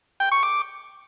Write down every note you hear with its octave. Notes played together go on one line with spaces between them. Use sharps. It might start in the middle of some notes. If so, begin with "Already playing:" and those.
G5
C#6
D6